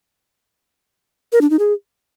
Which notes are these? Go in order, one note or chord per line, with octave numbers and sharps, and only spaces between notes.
A#4
D4
D#4
G#4